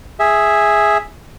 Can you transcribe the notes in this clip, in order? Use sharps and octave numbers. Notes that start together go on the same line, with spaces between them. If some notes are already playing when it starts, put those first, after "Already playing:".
G#4 E5